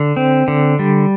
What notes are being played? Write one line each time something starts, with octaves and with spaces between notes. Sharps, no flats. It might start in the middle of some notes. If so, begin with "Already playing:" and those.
Already playing: D3
C4
D3
G3